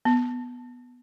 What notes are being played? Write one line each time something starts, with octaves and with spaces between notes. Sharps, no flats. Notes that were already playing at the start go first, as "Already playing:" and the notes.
B3